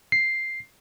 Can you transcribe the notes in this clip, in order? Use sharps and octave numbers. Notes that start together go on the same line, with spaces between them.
C7